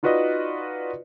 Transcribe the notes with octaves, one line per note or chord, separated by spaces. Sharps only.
D#4 F4 F#4 B4 D5 D#5